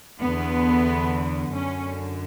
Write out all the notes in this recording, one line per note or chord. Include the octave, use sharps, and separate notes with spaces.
E2 D3 B3
F#2 D3 C#4